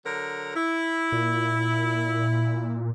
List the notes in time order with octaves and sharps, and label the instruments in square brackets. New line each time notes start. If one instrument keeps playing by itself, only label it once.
[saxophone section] D3 F#3 A#4
E4
[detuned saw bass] A#2